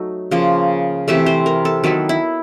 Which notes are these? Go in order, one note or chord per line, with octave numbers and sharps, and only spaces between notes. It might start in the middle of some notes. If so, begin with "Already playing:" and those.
Already playing: F#3 A3 D#4
C#3 F3 A#3
C3 E3 A3 E5
C5
A#4
A4
D#3 F#3 B3 E4 A4
E4